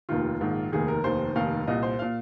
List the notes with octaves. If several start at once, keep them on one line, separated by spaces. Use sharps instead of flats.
F1 D#2 D#3 F4
A#1 G#2 D#3
F1 D#2 D#3 G#4
A#4
F1 D#2 D#3 C5
F1 D#2 D#3 F5
C2 A#2 D#5
C5
A#2 F5